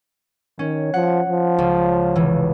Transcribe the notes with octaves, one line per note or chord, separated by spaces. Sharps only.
D#3 C#4
F3 F#5
F3
C#2
F1 E3